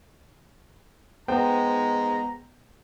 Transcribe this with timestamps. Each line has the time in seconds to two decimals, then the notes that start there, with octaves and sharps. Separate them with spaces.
1.28 G#3 B3 C5 G5 A#5